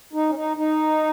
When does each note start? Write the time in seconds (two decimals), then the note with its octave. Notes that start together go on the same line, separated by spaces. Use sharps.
0.13 D#4
0.30 C#4
0.35 D#4
0.57 D#4